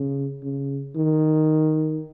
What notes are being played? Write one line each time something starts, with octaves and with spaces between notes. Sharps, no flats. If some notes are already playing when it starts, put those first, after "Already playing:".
Already playing: C#3
C#3
D#3